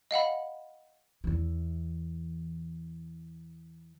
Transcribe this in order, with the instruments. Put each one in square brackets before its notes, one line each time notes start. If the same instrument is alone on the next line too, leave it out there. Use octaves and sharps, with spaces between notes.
[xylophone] D#5 F5 F#5 B5
[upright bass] E2 E3